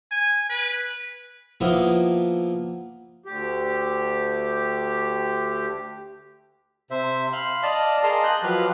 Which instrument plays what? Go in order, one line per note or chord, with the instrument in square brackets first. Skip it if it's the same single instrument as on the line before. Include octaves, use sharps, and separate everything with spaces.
[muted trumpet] G#5
B4
[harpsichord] F3 A#3 B3 E4 F4
[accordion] D2 G4
[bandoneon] C3 C5 E5
F5 B5 C6
D5 D#5 F5 A5
G#4 A#4 D#5 F5 A5 C6
D#5 F#6 G6
F3 F#3 G4 B4 F5